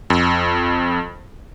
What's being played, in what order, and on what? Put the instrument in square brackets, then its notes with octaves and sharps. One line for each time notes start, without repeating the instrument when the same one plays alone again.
[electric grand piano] F2